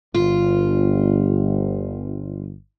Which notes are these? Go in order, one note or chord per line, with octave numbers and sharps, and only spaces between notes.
G1 F4